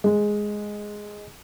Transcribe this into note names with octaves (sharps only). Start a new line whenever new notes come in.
G#3